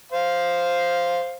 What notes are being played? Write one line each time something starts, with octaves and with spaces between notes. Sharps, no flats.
C5 F5